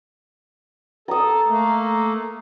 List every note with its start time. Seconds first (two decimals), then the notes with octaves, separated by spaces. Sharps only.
1.08 A4 A#5 D#6
1.47 A3 A#3